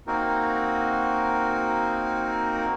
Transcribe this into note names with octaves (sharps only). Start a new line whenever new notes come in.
A#3 C4 D#4 F#4 A#4